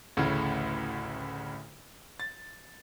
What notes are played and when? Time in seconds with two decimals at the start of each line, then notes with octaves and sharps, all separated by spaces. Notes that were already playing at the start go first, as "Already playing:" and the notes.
0.17 A1 D2 A2 C#3
2.20 A6